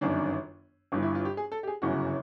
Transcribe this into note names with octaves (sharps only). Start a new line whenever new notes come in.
G1 F#2 D#3 D4
G1 G2 E3
E4
F4
G4
G#4
A4
G4
G#4
G1 F#2 C#3 E3 F#4